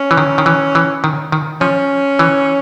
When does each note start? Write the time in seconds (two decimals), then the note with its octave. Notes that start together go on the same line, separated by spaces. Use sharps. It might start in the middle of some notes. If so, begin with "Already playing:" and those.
Already playing: C#4
0.11 E3
0.17 D#3
0.38 D#3
0.46 E3
0.75 E3
1.04 D#3
1.32 D#3
1.61 F3 C#4
2.19 E3